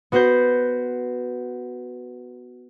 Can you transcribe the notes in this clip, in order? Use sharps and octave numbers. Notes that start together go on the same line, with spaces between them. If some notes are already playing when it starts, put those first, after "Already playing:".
B3 F#4 B4 C5 G6